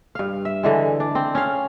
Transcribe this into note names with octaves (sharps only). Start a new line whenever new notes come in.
G2 F5
E5
D3 E3 G#3
D4
C4
C#4 F5